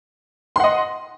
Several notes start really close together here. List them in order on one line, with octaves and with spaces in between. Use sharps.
C6 F#5 D#5